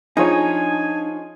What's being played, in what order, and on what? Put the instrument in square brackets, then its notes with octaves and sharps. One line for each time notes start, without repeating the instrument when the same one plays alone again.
[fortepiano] F3 G#4 C#5 [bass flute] D4 [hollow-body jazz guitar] D#4 [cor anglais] G#5